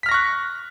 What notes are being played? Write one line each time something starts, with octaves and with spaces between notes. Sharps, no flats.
C#6 F6 F#6 A#6 B6